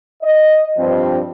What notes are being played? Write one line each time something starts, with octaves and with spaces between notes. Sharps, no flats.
D#5
G2 F3 C4